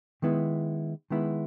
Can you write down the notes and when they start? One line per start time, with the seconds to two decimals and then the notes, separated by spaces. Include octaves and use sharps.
0.22 D#3 G#3 B3 E4
1.10 D#3 G#3 B3 E4